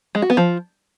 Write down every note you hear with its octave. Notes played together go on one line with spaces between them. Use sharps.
G#3
F#4
B3
F3